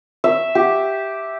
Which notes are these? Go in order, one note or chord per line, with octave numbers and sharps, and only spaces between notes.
E5
G4